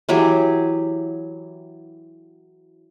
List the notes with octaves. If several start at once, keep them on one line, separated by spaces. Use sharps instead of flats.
E3 F#3 G4 G#4